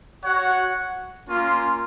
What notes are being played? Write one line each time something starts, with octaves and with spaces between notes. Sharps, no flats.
F#4 C#5 F#5
A#3 C#4 F4